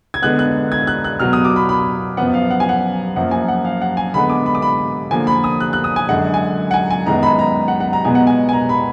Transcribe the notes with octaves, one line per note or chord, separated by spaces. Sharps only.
G#6
D3 G#3 B3 F#6
F#6
G#6
F#6
F#6
B2 F#3 B3 F6
D#6
D6
B5
B5
F#2 F3 B3 F#5
F5
F#5
G#5
F#5
F#2 F3 A#3 F#5
G#5
F#5
F5
F#5
G#5
D3 G#3 B3 B5
D6
B5
D6
B5
D3 F3 A#3 G#5
B5
D#6
F#6
F#6
D#6
G#5
F#2 D3 G#3 F#5
G#5
F#5
G#5
G#5
F#2 D#3 G#3 B3 A#5
B5
A#5
F#5
F#5
A#5
B2 G#3 B3 G#5
F#5
G#5
G#5
A#5
B5